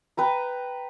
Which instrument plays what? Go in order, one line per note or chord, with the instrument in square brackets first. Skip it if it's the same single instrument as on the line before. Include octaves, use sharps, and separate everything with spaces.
[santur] B4 G5 A#5